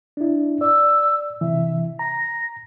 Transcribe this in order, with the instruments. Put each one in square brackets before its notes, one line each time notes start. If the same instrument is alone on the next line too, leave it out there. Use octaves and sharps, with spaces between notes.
[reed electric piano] D4 E4
[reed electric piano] D5 [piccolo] E6
[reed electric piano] C3 E3 [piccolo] E5
[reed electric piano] A#5 [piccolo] A#6